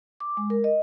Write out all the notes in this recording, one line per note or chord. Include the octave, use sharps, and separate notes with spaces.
D6
G#3
A#4
D#5